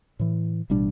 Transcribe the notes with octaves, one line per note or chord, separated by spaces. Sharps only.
A2 E3
A1 B2 G3 D4